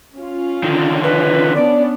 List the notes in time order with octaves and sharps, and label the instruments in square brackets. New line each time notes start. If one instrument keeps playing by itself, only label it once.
[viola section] C#4 F4
[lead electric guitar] D3 D#3
[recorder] B4
[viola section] B3 C#4 D4 [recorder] D5